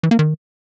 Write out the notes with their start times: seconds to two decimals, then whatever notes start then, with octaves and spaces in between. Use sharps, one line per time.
0.03 E3
0.11 A#3
0.19 D#3